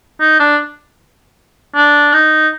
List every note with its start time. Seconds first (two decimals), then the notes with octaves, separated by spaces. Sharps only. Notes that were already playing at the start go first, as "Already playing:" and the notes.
0.20 D#4
0.39 D4
1.75 D4
2.13 D#4